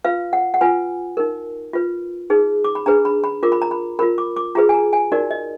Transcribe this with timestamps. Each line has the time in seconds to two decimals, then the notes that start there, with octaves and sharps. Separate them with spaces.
0.04 F4 B4 F5
0.33 F#5
0.54 F#5
0.61 F4 B4 G#5
1.17 D#4 A#4
1.73 F4 B4
2.30 D#4 G#4 B4
2.64 D6
2.75 B5
2.86 D4 G#4 B4 A#5
3.05 B5
3.24 B5
3.43 F4 A#4 D6
3.52 B5
3.62 A#5
3.71 B5
3.99 F4 A#4 B5
4.18 D6
4.36 D6
4.55 F4 G#4 B4 A#5
4.69 G#5
4.74 A#5
4.93 G#5
5.12 D#4 F#4 A#4 D5
5.31 D#5